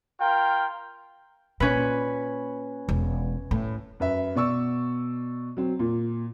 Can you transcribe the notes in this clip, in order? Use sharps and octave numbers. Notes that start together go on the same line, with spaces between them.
F4 A#4 G5
A#2 C#4 B4
E1
A2
F#2 B4 E5
B2 D5 C#6 E6
F#3 C4
A#2